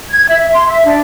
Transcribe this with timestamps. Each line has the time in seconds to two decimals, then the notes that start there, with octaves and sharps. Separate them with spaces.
0.10 G#6
0.30 E5
0.53 C6
0.68 E5
0.85 D4